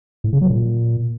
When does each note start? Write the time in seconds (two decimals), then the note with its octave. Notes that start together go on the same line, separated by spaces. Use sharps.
0.24 A2
0.33 C#3
0.41 F#3
0.50 A#2